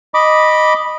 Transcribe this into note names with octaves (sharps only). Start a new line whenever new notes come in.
D#5 B5 D6